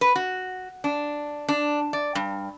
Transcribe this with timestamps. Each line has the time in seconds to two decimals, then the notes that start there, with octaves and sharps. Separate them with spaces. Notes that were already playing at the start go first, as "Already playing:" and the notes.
0.01 B4
0.16 F#4
0.84 D4
1.49 D4
1.93 D5
2.15 G2